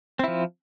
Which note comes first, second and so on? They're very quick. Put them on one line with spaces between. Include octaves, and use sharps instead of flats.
C4 E4 F3